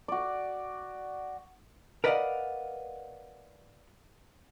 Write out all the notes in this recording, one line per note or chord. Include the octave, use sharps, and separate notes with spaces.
F#4 D5
A#4 B4 D5 D#5 F5 F#5